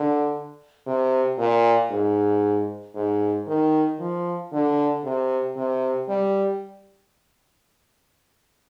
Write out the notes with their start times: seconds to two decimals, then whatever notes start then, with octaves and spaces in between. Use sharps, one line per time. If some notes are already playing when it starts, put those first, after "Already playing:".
Already playing: D3
0.87 C3
1.38 A#2
1.91 G#2
2.95 G#2
3.47 D#3
4.00 F3
4.52 D3
5.04 C3
5.56 C3
6.08 G3